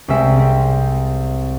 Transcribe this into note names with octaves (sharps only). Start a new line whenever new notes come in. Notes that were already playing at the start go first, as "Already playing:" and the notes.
C2 G#3 C4 E5
C4